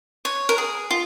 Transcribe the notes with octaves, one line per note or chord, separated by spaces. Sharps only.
C#5
A#4
G#4
F4